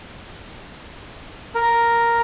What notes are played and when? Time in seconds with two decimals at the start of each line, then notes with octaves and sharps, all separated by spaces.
1.55 A#4